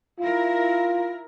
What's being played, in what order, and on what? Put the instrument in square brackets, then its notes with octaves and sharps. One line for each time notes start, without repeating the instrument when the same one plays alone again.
[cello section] E4 A#4 [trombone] F4